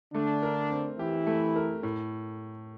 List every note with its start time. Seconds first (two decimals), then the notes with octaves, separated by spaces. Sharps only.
0.14 D3 A3 D4
0.43 A#4
0.70 C4
0.99 E3 E4 G4
1.27 A3
1.56 A#4
1.83 A2